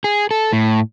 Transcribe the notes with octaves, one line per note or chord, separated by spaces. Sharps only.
G#4
A4
A2